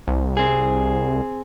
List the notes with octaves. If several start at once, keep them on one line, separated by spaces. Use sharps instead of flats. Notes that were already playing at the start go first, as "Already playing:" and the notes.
C2
C4 G#4